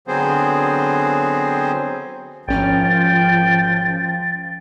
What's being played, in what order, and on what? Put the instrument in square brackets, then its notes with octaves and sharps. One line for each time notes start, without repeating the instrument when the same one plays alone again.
[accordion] D3 F#3 B3 C4 G#4 C5
[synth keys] G#1 C#4 F6 [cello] F3 [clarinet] G5 [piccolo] A6